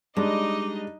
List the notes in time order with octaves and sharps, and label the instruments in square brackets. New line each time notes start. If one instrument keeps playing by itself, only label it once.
[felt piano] G3 D4 [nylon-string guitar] G#3 [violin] D#4 D#5 [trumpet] D6